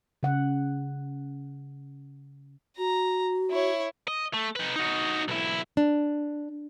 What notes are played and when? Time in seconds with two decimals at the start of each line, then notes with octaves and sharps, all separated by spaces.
0.23 C#3 F#5
2.78 F#4 A#5
3.51 E4 C#5
4.07 D#5
4.33 A3
4.56 D#4 B4
4.76 D#4 F#4
5.28 B1 E4
5.77 D4